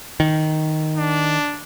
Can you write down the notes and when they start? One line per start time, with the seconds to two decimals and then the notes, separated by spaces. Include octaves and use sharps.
0.20 D#3
0.97 D4